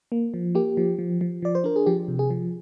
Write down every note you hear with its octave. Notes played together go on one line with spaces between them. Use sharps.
A#3
F3
A#3 G4
F3
F3
F3
F3 D5
C5
D4 A#4
G#4
F3 G4
C3
G#4
F3